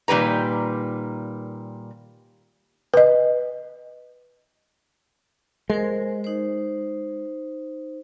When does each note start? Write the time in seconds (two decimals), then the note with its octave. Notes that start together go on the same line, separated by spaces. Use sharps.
0.08 A#2 D#3 G3 B4 A#5
2.94 B4 D#5
5.70 G#3 A#4 C5
6.24 D#4 C5